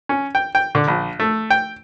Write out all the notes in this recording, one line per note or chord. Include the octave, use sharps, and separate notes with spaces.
C#4
G5
G5
D3
A#1
A3
G5